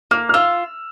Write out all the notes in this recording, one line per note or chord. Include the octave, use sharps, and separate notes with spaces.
A#3 F6
F6
F4 E6